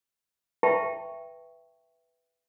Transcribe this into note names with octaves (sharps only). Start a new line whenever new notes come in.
B4 E5 G5 A5 C#6